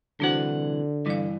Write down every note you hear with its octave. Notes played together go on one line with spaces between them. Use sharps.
C2 D3 E3 D4 F#4 C5 F#5
G2 E3 G3 F5